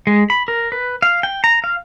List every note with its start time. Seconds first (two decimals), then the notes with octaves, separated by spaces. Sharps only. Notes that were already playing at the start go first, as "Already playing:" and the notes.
0.07 G#3
0.30 B5
0.48 A#4
0.72 B4
1.02 F5
1.23 G5
1.44 A#5
1.64 F5